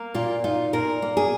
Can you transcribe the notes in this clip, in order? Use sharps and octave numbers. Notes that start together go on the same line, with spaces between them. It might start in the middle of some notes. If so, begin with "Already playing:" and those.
Already playing: A#3
A#2 F4
D#4 F4
A#2 A#4
A#3
G#4